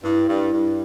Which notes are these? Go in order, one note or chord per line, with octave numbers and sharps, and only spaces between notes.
G2 E4
G2
G2